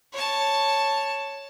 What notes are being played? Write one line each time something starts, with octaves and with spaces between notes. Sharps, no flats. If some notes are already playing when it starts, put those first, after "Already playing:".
C#5 A5